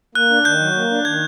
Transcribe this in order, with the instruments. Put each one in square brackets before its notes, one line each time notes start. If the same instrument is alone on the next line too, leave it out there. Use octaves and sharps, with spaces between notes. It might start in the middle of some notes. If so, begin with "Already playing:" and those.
[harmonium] A#3 [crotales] F#6
[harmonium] D4
[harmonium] D#3 [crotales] G6
[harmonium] F#3
A#3
D4
[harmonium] D#3 [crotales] G#6